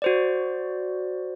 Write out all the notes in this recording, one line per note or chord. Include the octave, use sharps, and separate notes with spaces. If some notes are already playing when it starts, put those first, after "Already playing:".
F#4 C5 D5